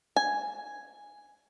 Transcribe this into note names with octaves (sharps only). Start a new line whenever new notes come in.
G#5